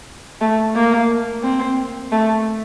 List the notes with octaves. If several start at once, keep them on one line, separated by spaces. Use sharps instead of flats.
A3
A#3
C4
A3